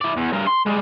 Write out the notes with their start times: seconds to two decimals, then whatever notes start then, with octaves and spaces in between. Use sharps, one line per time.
0.01 E4 D5
0.17 E2
0.33 G2 A#4
0.47 C6
0.66 G3 G#3